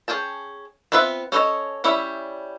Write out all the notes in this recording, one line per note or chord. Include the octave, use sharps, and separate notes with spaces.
C#4 G#4 G5 A5
B3 C4 F4 B4 E5
C#4 A4 C5 C#5 D#5
G3 C#4 E4 E5